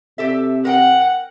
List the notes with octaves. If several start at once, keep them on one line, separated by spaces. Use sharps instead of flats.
C3 G4 A4 E5
A#4 F#5 G5